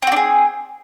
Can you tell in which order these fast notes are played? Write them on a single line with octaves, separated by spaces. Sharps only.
C4 F#4 D4 G#4